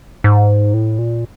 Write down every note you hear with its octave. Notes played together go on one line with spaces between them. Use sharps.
G#2
A2
A#2